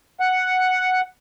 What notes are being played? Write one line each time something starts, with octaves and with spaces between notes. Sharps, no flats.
F#5